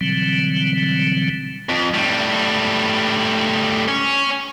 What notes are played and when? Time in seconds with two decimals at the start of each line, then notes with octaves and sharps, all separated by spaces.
0.01 B2 D3 E3 F#3 G3 C4
1.69 F2
1.94 A2 G3
3.88 C#4